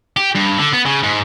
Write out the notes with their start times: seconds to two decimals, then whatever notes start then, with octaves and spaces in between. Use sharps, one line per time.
0.17 G4
0.36 G2
0.59 D3
0.74 B3
0.86 C#3
1.03 G#2